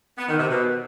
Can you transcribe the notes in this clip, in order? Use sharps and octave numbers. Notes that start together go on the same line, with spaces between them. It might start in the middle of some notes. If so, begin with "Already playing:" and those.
B3
D#3
C3
B2